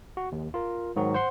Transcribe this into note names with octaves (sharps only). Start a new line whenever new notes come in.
F#4
D#2
F4 A#4
G#2 D#3 F#3 F#4
C5 F#5 C6